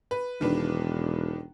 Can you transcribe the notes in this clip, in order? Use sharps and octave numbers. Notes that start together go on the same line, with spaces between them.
B4
E1 D#3 D4 B4